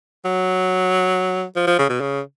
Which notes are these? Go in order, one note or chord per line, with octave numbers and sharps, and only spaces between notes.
F#3
F3
F3
C#3
B2
C#3